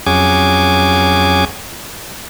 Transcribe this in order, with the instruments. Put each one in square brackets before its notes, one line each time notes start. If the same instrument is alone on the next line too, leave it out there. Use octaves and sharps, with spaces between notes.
[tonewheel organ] F2 F#3 C#4 G#4 G#5 D6